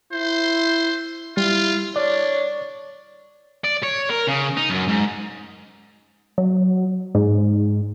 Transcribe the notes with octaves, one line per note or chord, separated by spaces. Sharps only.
E4 C5
G3 E4 F4
D4 C#5 D5
D5
C#5
A#4
C#3
D#4
F#2
G#2
F#3
G#2